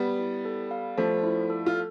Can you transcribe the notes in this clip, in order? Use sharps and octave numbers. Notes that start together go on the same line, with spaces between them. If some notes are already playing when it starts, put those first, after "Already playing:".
Already playing: G3 B3
E4
A4
F5
F3 A3 C5
E4
A4
F4